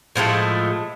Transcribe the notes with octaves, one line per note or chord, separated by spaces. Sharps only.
A2 F3 G#3 A3